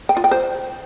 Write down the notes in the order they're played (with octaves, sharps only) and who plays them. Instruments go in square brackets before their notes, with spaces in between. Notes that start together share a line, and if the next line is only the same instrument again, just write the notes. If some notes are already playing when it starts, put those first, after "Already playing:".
[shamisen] G5
F4
G5
C5